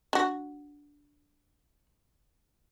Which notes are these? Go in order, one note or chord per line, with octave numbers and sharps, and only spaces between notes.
D4 F#4